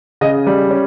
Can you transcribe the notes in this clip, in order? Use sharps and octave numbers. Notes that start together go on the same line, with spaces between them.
C#3 D#5
G3
C#4